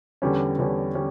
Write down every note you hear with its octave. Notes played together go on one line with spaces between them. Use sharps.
E2 D3 G3 C#4
E2 D3 G3 C#4
D3 G3 C#4